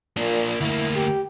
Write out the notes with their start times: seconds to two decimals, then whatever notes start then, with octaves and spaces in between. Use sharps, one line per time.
0.17 A#2 A#3 D4
0.61 D2 A#3 E4
0.95 G4